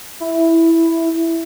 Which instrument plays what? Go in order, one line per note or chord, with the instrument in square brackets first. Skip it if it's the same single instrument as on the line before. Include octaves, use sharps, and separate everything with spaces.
[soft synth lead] E4